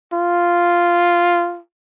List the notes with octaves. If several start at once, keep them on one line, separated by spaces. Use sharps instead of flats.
F4